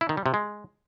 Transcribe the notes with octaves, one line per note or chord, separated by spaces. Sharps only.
E4
D#3
G3
C3
G#3